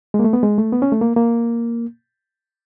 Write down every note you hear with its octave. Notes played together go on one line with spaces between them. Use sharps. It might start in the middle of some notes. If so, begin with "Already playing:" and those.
G#3
A#3
A3
B3
G#3
A3
B3
C#4
A3
A#3
A#3